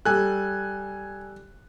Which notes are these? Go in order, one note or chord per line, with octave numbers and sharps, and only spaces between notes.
G3 A4 G#5 F#6